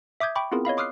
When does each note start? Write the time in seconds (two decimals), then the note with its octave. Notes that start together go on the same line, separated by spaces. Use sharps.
0.20 E5 D6 D#6 G6 G#6
0.35 G5 B5 C#6 D6
0.52 B3 C4 E4 F4 G#4 A#4
0.65 C#5 D#5 F5 B5
0.77 C6 D6 D#6 F6 F#6 C7